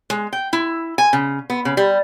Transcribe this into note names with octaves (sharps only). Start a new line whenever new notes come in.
G#3
G5
E4
G#5
C#3
B3
C#3
G3